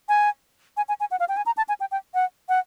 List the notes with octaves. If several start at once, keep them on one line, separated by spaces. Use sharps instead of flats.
G#5
G#5
G#5
G#5
F#5
F5
G5
G#5
A#5
A5
G#5
G5
G5
F#5
F#5